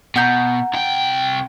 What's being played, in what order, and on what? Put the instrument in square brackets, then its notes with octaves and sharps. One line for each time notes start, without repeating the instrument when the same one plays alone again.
[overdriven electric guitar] B2 [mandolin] F#5 A#5 G6
[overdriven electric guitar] C2 G5